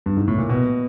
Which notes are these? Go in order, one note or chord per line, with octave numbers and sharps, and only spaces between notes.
G2
G#2
A2
A#2
B2